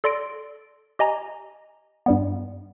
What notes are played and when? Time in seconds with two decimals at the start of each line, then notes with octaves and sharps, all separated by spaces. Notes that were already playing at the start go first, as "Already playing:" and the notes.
0.04 A4 D5 C6 A#6 D7
0.99 G4 D#5 G#5 A#5
2.06 G2 G3 B3